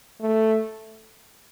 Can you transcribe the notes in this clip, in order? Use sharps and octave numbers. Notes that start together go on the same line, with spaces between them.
A3